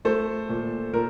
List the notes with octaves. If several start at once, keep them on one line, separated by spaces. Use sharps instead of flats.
A3 A4 C5
A#2
A#2 A#4